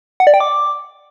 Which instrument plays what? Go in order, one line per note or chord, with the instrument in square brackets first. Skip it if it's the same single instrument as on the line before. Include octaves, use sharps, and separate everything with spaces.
[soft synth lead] F#5
D5
G5
D6